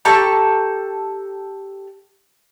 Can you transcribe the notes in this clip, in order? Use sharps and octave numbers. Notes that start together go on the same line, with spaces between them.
G4 A4 A#5 C#6